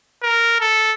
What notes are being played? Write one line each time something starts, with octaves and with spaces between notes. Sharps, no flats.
A#4
A4